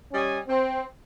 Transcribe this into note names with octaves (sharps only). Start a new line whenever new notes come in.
G3 C#4 D#5 G#5
C4